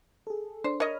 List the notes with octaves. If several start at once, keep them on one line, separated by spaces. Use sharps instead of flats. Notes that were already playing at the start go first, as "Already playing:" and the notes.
G#4 A4
D4 C5
A#4 C#5 D#5 B5 F6